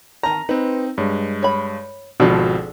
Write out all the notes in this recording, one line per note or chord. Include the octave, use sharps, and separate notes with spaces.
D#3 A5 A#5
C4 D#4 B4
G2 G#3 C#5
C#5 B5
G#1 B2 F3 D4 G#4 A4